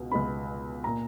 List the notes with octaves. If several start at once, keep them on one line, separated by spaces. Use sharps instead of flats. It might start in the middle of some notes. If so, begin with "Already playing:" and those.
Already playing: C#2 B2
C#2 B2 G#3 B3 B5
A#2 A#3 A#5